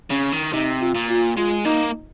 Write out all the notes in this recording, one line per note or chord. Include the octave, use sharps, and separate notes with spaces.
C#3 C#4
D#3
C3 D#4
F4
A#2
F4
G#3 F4
A#3 D#4